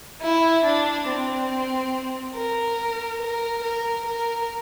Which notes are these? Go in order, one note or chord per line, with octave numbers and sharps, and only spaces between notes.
E4
D4
C4
A#4
A#4
A#4
A#4